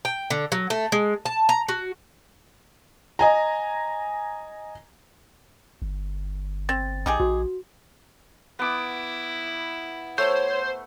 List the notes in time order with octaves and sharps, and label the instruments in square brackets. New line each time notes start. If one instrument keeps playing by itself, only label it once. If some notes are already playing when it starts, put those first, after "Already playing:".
[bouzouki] G5
D3
F#3
A3
G#3
A5
A#5
F#4
[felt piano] D#5 G#5 A#5
[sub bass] G1
[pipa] C4 [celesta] A6
[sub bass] A#1 [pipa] D#4 G4 G#4
[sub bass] A#1 [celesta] F#4
[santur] B3 D6 [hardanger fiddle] E4
[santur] A3 [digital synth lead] C5 [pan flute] C#5